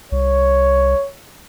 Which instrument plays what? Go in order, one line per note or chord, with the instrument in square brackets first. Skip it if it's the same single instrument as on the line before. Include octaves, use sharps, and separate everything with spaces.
[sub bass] C2 [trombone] C#5